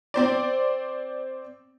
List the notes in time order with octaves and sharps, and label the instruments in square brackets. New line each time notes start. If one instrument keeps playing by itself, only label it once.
[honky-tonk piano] C4 C5 D5